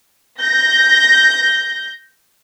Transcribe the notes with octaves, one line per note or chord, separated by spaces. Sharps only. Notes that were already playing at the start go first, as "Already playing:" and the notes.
G6 A#6